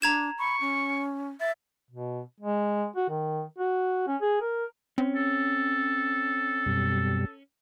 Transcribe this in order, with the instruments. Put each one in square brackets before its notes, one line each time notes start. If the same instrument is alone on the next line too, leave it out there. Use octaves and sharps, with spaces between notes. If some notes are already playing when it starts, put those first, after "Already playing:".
[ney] D4 [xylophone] A#5 G#6 E7
[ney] B5 [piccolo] C#6
[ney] C#4
[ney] E5 [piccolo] A6
[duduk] B2
G#3
F#4
D#3
F#4
C#4
G#4
A#4
[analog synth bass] C4 [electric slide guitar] C#4
[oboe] A4
[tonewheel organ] F#2 B2 G3